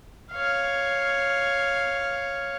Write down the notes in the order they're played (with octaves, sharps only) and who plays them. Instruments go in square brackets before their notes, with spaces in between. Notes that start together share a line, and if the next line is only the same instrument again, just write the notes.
[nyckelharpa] C#5 F5